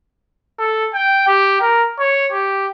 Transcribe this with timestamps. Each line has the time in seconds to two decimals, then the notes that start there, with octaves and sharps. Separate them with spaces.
0.59 A4
0.94 G5
1.27 G4
1.61 A#4
1.99 C#5
2.32 G4